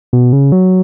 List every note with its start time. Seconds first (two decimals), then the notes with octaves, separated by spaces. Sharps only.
0.13 B2
0.33 C#3
0.52 F#3